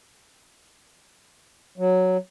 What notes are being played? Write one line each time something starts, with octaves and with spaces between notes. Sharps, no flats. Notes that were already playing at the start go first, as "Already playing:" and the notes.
F#3